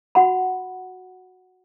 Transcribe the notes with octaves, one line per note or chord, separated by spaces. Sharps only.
F#4 F#5 B5